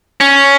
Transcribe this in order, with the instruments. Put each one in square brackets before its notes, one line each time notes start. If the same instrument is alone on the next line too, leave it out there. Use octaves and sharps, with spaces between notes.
[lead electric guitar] C#4